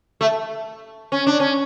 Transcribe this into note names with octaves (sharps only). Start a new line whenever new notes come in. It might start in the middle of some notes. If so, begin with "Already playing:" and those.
A3
C#4
D4
C#4